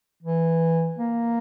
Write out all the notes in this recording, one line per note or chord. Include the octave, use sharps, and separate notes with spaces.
E3
A#3